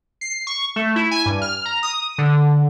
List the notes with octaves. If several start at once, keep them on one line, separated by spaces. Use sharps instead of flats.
C7
C#6
A3
E4
G#5
G2
F6
A#5
D#6
D3